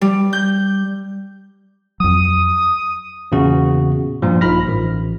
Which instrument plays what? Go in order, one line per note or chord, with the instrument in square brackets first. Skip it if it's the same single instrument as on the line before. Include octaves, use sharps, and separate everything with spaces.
[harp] G3
G6
[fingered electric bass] F2 F#3 [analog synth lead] D#6
[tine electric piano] E2 A#2 C#3 F#4
G2 A#2 F3
A#1 D#4 F4 B5 F6 A#6
A1